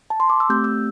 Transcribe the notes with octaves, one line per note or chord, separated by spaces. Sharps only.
A5
C6
D6
E6
A3 C4 G4 G6
E6